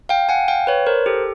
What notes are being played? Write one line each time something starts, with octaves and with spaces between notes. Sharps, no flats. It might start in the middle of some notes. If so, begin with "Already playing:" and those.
F5 G5
F#5 G#5
F5 G5
B4 C#5
A#4 C5
G4 A4